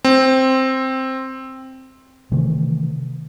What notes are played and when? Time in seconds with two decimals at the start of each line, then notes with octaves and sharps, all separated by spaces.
0.05 C4
2.32 C3 D#3 E3 A3